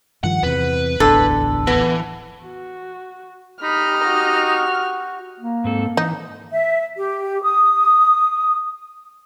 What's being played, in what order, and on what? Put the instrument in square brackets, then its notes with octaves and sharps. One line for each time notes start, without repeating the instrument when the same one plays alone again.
[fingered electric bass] G2 D#3 F3 [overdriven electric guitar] F#5
[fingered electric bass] E2 C3 [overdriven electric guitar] B4
[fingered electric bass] D1 A1 E2 [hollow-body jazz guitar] D3 [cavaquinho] A4
[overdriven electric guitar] E3 [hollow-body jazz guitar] B3
[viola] F#4
[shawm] D#4 [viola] G4 D#5 [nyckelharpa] B5 [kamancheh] F6
[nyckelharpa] F#4
[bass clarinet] A#3
[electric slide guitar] G#2 C4 A4
[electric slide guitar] E3 [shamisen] D#4
[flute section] E5
G4
D#6